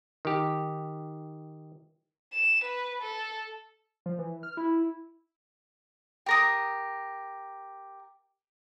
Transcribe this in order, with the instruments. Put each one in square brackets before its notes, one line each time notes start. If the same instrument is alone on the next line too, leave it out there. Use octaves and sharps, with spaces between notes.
[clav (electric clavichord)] D#3 G4
[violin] E7
B4
A4
[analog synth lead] F3
E3
F6
E4
[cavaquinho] G4 A#4 D#6